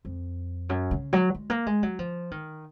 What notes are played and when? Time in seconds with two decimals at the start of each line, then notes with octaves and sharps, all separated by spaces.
0.05 F2
0.69 F#2
0.91 C#3
1.13 F#3
1.35 G#3
1.50 A#3
1.66 G#3
1.83 F#3
1.99 F3
2.31 D#3